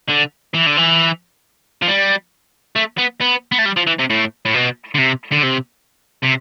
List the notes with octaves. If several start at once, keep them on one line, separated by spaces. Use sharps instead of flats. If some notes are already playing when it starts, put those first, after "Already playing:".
D3
E3
D3
E3
F3
G3
A3
B3
B3
B3
A3
G3
F3
E3
C3
A2
A2
B2
D3
C3
D3
C3
C3